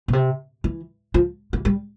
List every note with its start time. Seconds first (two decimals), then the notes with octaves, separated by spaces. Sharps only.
0.08 B2
0.13 C3
0.64 E3
1.14 F3
1.53 E3
1.65 G3